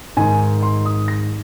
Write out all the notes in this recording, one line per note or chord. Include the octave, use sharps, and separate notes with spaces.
G#2 D#3 G#5
C6
D#6
A#6